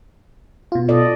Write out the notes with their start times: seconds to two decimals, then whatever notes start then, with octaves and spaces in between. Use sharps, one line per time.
0.72 B2 F4
0.88 A4 D5 D#5